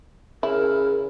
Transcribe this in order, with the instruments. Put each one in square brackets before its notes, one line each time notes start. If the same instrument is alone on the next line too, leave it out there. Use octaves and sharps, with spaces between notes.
[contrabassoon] C#3 [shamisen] E4 [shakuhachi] A#4